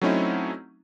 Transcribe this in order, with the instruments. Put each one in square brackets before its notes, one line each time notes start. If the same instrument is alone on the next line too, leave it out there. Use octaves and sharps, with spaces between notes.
[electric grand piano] F#3 A3 C4 C#4 D#4 E4